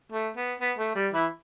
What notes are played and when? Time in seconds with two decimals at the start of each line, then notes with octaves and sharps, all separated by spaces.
0.12 A3
0.36 B3
0.60 B3
0.78 A3
0.95 G3
1.13 E3 E4